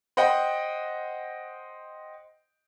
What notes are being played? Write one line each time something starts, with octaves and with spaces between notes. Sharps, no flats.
C5 D#5 F#5 G5